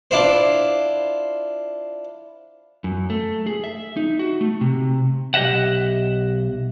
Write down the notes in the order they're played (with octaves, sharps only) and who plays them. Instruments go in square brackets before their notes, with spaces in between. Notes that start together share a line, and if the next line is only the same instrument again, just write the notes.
[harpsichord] D4 E4 F4 C5
[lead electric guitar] F#2
A3
G#4
E5
D#4
F#4
A3
C3
[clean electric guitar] B1 G4 D#5 E5 F#5